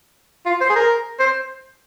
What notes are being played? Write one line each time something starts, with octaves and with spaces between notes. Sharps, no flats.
F4
C5
G#4
A#4
C5